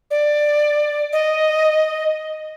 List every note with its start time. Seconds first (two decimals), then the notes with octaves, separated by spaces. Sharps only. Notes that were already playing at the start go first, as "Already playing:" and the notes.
0.11 D5
1.13 D#5